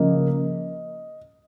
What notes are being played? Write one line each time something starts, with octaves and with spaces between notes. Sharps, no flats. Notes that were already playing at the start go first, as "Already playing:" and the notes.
Already playing: C#3 F3 A#3 D#5